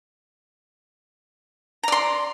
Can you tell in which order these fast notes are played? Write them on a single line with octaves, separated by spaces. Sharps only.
A#5 D5 C6